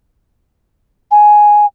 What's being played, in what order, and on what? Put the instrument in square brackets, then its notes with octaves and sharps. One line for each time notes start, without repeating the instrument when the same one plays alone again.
[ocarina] G#5